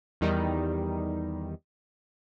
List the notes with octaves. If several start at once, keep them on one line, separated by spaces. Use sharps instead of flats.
E2 D#3 G3 D#4